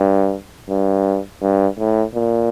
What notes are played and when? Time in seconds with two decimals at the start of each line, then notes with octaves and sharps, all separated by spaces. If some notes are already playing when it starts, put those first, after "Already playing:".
Already playing: G2
0.69 G2
1.42 G2
1.79 A2
2.15 A#2